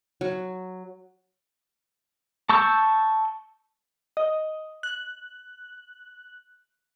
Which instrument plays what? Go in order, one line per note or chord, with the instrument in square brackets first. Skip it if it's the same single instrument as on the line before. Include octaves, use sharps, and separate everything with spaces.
[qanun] F#3
[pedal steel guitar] A5 C#6 E6 G6
[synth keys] D#5
F#6